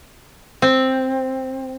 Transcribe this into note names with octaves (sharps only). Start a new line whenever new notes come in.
C4